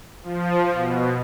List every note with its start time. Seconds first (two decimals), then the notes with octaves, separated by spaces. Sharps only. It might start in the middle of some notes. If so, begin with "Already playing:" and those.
0.23 F3
0.74 B2